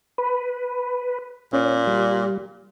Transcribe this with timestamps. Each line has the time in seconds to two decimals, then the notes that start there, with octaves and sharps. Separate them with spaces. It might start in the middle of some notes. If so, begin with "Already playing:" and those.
0.18 B4
1.53 A#2 C#4
1.87 G3